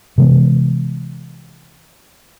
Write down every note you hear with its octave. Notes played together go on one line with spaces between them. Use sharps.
C3 E3 G#3 B3